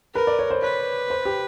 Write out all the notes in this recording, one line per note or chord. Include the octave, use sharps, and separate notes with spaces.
A#4 B4
D5
C#5
C5
B4 C#5
C5
G4